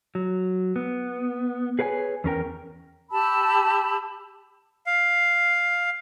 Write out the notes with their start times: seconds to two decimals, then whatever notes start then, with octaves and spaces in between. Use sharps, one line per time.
0.15 F#3
0.76 B3
1.79 G#4 B4 C#5 F#5 G#5
2.24 E2 C#4 A#4 G5
3.11 G4 A5 B5 E6
4.86 F5